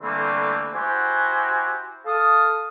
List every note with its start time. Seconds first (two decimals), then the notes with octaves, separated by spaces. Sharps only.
0.02 D3 E3 G3 A3 A#3 C4
0.74 E4 F#4 G4 C5 F#5 G#5
2.06 A4 F5 D#6